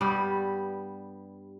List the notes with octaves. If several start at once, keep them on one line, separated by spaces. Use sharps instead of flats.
G2 G3 B3 G4